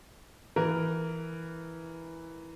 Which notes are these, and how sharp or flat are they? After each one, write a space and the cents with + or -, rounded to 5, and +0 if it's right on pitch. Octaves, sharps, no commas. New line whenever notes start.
E3 +0 A#4 +0